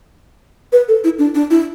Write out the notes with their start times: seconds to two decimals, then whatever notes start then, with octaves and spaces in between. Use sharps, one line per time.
0.73 B4
0.88 A4
1.04 E4
1.19 D4
1.35 D4
1.50 E4